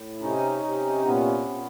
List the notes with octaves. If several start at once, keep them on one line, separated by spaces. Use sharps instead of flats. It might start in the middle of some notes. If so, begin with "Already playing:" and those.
Already playing: A2
C3 C#4 D#4
C3
A#2 B3 C#4
A#2